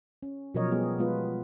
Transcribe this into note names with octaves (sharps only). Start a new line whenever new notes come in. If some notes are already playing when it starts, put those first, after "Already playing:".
C#4
B2 F3 F#3 A#4 C#5 D#5
G3 B3 G4 G#4
G#3 B3 F4 B4